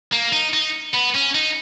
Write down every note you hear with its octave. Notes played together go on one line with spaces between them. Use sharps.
A#3
D#4
D#4
B3
C#4
D#4